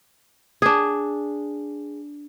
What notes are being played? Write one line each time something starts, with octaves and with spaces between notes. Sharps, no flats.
D4 G#4